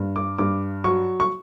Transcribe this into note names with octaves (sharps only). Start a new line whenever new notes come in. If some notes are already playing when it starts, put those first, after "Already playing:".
Already playing: G2
D6
G2 D6
F#3 C#6
C#6